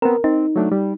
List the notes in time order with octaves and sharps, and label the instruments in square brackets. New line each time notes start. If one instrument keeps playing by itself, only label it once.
[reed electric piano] B3 C4 [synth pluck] A#4
[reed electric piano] C4 [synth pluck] D#4
[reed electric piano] F#3 A3 D4
G3